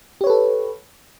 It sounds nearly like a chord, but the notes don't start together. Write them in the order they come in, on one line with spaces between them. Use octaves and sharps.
G4 C#5 B4 A4